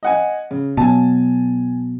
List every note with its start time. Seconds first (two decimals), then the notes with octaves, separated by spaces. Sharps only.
0.03 D#5 F#5 G#5
0.51 C#3
0.77 B2 F#3 G#5 A5